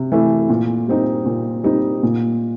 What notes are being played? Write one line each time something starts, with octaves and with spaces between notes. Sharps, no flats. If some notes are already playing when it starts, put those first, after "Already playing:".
Already playing: C3
E3 A3
A#2
G3 C4 D#4
A#2
G3 C4 D#4
A#2